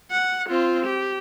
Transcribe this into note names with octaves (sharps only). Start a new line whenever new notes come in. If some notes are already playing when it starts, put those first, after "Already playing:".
F#5
C4 F4
G4